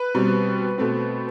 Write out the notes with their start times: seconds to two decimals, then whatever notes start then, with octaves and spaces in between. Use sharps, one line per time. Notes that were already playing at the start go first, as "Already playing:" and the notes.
Already playing: B4
0.14 B2 G3 C4
0.78 B2 A3 C4